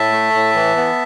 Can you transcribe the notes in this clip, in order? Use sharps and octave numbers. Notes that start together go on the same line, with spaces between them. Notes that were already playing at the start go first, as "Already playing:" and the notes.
Already playing: A2 E5 A5
A3
A2
E3
B3